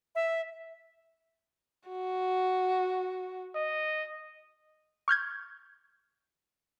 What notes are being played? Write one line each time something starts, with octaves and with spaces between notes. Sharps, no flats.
E5
F#4
D#5
C#6 F6 G6 G#6